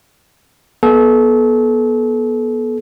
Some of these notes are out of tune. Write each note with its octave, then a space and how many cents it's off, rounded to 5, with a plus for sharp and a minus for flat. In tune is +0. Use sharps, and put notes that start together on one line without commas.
B3 -25 A4 -35